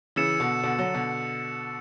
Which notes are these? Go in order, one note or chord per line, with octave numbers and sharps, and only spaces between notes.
C#3 E3 E6 A6 C#7 E7
B2 D3
B2 D3
D3 F#3
B2 D3